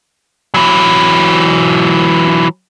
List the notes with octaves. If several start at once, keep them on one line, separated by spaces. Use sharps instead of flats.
E3 F#3